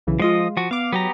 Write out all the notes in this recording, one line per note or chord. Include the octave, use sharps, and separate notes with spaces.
B1 C#3 E3
F3 G#3 F4 D#5
F3 F#4
B3 F5 D6
F#3 B3 G4 A#5